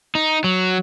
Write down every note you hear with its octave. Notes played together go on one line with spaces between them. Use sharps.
D#4
F#3